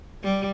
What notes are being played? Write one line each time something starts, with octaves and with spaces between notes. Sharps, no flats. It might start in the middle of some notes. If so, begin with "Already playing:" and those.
G3